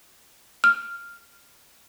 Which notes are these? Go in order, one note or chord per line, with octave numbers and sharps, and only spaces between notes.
F6